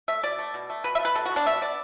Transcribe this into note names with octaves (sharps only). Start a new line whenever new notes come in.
A3 E5
B2 D5
A3
B2
A3
B2 B4
E5
A3
B4
B2 A4
F#4
B3
D4
B2 E5
B3 D5